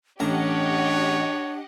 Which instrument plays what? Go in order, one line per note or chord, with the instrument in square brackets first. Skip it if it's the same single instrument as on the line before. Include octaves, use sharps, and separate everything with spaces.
[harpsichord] A1 A#5 [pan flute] D4 [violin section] G4 D#5 F#5 [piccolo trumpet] C#5